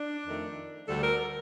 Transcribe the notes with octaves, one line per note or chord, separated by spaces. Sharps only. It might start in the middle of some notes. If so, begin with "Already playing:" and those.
Already playing: D4
F2 D#3 A3
D2 D3 G3 A4
A#4